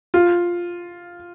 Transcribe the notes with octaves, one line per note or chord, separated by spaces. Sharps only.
F4